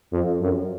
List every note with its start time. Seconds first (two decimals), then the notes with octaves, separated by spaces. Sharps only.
0.12 F2
0.41 F#2